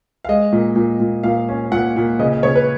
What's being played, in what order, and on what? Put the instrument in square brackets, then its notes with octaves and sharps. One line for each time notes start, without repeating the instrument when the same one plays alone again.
[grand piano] F5
G#3 D#5
A#2
A#2
A#2
A#2 F5
C#4
A#2 F#5
A#2
C#3 D#5
D#5
C#3 C#5
B4